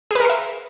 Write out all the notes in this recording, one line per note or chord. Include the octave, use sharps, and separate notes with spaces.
G#4 A#4 B4 E5 C6